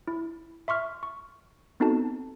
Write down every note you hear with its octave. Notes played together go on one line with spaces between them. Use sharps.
E4
E5 C6 C#6 F6
C#6
B3 C4 D#4 F#4 A4 A5